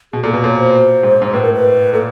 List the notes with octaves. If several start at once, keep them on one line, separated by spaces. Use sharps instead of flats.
B2 G#4
A#2 A4
B2 B4
A#2 C#5
C5
G#2
G#2
A2 B4
A#4
B4
A#2 A4